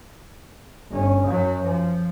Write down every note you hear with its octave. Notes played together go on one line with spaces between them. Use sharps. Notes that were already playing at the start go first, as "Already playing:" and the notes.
G1 C#4
F#2 F#3
F3